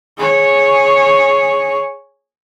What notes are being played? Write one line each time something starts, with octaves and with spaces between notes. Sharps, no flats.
G#4 C#5